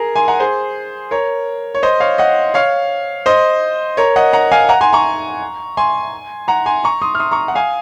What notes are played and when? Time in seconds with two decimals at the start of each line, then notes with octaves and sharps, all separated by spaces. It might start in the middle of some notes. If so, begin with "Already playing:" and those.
Already playing: G#4 A#4
0.16 G#5 C6
0.28 F#5 A#5
0.40 G#4 C5
1.11 A#4 C#5
1.74 C#5
1.83 C5 D#5
2.00 C#5 F5
2.18 D#5 F#5
2.54 C#5 F5
3.26 C5 D#5
3.97 A#4 C#5
4.16 D#5 F#5
4.33 F#5 A#5
4.51 F5 G#5
4.69 F#5 A#5
4.81 G#5 C6
4.93 A#5 C#6
5.77 G#5 C6
6.48 F#5 A#5
6.66 G#5 C6
6.84 A#5 C#6
7.02 C6 D#6
7.15 F6
7.20 C6 D#6
7.31 A#5 C#6
7.48 F#5
7.55 F5 G#5